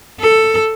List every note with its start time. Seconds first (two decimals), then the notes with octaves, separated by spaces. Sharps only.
0.21 A4